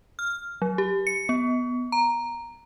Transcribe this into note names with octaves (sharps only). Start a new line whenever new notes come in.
F6
F#3
G4
C#7
B3
A#5